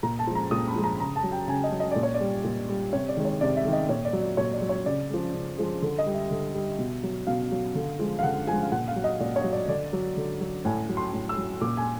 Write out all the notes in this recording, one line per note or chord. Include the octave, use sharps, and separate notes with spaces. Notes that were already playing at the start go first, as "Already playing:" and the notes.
A#2 A#5
A5
F3 G#3
A#5
A#2 D#6
B5
F3 G#3
A#5
C#3 A#5
A5
F#3
G5
C#3 G#5
D#5
F#3
D#5
A#2 D5
C#5
D5
G3
A#2
G3
C3 C#5
D5
D#3 G#3
C#5
C3 D5
E5
D#3 G#3
D#5
A#2 C#5
D5
F#3
D5
A#2 C#5
D5
F#3
C#5
C#3 D5
F3 G#3
C#3
F3 G#3
D3
D#5
G3
E5
D3
G3
B2
F#3
B2 F5
F#3
D3
F3 G#3
F5
D3 F#5
F3 G#3 G#5
F5
A#2 F#5
F5
F#3
D#5
A#2 D5
C#5
F#3
D5
D3 D5
F#3
D3
F#3
A2 G#5
F#3
C6
A2
E6
F#3
A#2 D6
G#5